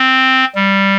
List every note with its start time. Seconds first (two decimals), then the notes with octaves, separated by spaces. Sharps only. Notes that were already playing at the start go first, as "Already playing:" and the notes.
Already playing: C4
0.55 G3